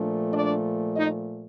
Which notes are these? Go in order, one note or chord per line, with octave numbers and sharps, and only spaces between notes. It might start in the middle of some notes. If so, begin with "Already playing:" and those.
Already playing: A#2 F3 A3 D4
D4 D5
D#4 D#5